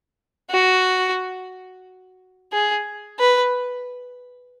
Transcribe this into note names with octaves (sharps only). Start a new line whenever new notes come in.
F#4
G#4
B4